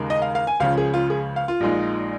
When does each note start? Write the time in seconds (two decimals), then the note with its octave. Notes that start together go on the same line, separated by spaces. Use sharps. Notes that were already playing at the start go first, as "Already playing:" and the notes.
Already playing: D#2 C#3 G#3 D#4 A#4
0.10 D#5
0.22 F5
0.35 F5
0.47 G#5
0.60 C#2 C#3 F3 C#4 F5
0.78 G#4
0.94 F4
1.10 G#4
1.36 F5
1.48 F4
1.60 A#1 A#2 G#3 D#4